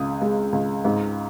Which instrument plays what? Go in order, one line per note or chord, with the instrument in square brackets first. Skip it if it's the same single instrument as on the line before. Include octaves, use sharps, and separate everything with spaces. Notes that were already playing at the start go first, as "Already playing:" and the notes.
Already playing: [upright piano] C#2 C#3 D#6
G#3
C#2
G#2